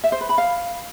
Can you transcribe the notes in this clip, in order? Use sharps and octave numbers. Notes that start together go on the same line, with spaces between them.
E5
C5
B4
B5
F5